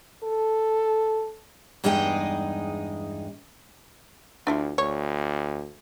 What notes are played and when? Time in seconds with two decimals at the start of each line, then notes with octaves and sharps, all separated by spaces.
0.24 A4
1.84 E2 G2 G#3 D#4 G#4 G5
4.47 D2 D4 E4 F4
4.78 D2 C#5